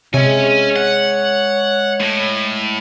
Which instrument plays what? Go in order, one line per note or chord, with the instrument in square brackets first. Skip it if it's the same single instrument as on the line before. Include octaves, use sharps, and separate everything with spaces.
[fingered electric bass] C3 [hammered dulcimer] G#3 E5 [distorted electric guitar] C#4 G#5 [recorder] C#5
[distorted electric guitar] F#5
A2